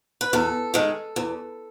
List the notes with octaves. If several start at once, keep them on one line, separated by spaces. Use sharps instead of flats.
B4
E2 A4
D#3 G#3
E2